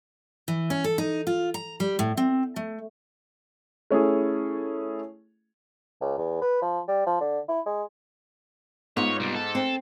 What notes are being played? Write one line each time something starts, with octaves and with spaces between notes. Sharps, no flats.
E3
C#4
A4
D#4
F4
A#5
G3
A2
C4
A3
A3 C#4 E4 G#4
C#2
E2
B4
F3
G3
F3
D3
E4
G#3
G#2 B3 F4 C#5
C2 G3
A4
C4